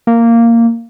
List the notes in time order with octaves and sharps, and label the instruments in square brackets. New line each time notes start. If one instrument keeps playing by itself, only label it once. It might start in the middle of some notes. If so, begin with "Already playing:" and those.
[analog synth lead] A#3